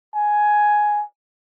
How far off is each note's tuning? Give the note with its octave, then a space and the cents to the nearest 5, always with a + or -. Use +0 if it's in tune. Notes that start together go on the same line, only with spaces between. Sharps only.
G#5 +10